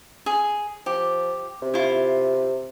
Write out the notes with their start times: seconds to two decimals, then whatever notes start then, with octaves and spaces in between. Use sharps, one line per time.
0.26 G#4
0.86 F3 G4
1.62 C3
1.74 E4 F4